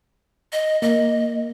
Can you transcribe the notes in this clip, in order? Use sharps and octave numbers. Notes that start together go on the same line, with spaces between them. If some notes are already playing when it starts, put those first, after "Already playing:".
D#5
A#3 D#5